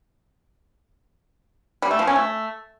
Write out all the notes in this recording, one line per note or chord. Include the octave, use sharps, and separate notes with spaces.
G3
A3
F3
C#4
A3